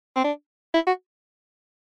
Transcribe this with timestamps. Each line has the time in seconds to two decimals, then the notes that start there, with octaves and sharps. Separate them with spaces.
0.16 C4
0.24 D4
0.74 E4
0.87 F#4